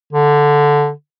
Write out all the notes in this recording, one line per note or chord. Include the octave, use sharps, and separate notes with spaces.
D3